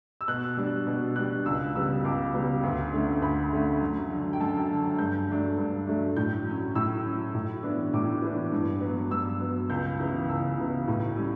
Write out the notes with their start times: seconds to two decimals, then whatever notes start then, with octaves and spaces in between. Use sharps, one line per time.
0.21 E6
0.28 B2 F#6
0.57 G3 D4
0.87 B2
1.16 G3 D4 F#6
1.46 C#2 E6
1.75 C#3 G3 B3 E6
2.04 C#2 D6
2.34 C#3 G3 B3
2.63 D2
2.93 D3 A3 C#4
3.22 D2 B5
3.52 D3 A3 C#4
3.81 F#2
4.11 D3 F#3
4.33 G5
4.40 F#2 A5
4.70 D3 F#3
4.99 G2 G6
5.29 F#3 A3 D4
5.58 G2
5.87 F#3 A3 D4
6.16 A2 G6
6.46 F#3 C#4
6.75 A2 E6
7.05 F#3 C#4
7.35 A2
7.63 E3 B3 D4
7.93 A2 D6
8.22 E3 B3 D4
8.52 G2
8.81 F#3 B3
9.11 G2 E6
9.40 F#3 B3
9.70 C#2 G6
9.99 C#3 E3 B3
10.29 C#2 E6
10.58 C#3 E3 B3
10.88 A2
11.17 G3 C#4